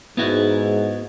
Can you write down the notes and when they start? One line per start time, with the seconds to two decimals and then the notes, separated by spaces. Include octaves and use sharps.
0.17 G#2 B3 E4 F#4